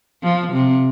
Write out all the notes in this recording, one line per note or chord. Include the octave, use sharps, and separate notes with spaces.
F3
C3